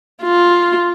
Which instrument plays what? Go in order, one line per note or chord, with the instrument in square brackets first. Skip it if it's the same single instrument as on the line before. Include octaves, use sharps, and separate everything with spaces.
[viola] F4